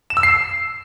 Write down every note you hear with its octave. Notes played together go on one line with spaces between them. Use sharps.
E7
E6
C7